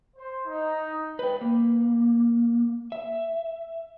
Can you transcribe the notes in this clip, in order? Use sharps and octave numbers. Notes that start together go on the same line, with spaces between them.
C5
D#4
B4 G5
A#3
E5